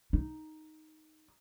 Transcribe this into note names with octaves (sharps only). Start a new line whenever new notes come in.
D#4